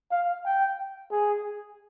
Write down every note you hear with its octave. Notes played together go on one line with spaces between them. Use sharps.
F5
G5
G#4